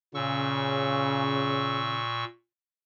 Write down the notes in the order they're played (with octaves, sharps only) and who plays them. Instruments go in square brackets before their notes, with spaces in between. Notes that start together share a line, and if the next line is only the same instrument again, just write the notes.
[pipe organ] A#2 C#6 E6 [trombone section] C#3